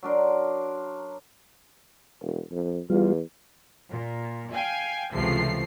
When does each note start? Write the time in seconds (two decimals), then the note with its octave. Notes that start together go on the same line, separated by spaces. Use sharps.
0.03 F#3 D4 A#4 C6
2.22 E1
2.51 F2
2.90 E2 G3 F4
3.91 A#2
4.53 F5 G5 G#5
5.13 C#2 C3 E3 F3 A3 C7